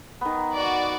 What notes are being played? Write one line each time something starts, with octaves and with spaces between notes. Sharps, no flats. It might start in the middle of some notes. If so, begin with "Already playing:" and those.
D#3 B3
F#4 D5